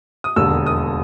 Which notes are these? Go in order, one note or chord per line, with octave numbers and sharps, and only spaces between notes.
D#6
E1 D#2 D3 E6
D#6